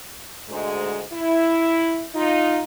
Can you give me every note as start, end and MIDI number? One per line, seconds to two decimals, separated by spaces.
0.49 1.01 38
0.49 1.01 44
0.49 1.01 56
1.12 2.04 64
2.15 2.62 63
2.15 2.62 65